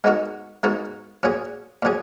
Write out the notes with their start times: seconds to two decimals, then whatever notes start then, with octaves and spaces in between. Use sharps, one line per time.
0.04 G#3 B3 D#4 F#4 A#4
0.63 G#3 B3 D#4 F#4 A#4
1.23 A#2 F#3 C#4 G#4
1.82 A#2 F#3 C#4 G#4